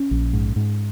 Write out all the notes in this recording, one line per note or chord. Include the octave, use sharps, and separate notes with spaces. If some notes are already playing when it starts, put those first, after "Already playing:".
Already playing: C#4
A#1
G#2
G#2